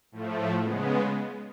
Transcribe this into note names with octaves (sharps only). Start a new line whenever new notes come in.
A2 F3 A3
C#3 G#3 B3